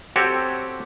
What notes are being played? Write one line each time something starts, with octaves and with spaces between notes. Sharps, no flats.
C4 F#4 G4 A4 C#5